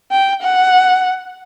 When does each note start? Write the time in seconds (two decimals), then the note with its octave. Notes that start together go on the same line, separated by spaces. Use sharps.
0.12 G5
0.42 F#5